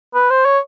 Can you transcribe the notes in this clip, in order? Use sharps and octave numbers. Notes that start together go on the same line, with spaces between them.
B4
C5
C#5